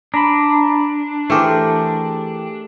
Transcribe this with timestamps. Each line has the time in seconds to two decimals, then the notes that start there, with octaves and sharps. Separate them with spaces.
0.14 D4 A#5 B5
1.30 E3 A3 G4 G#4 A#4 C5